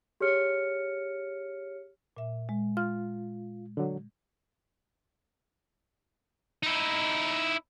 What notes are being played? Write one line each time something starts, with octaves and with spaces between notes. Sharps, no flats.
G4 G#4 C#5 F6 C#7
A#2 E5
G#3
F4 F6
D3 F#3
D#4 E4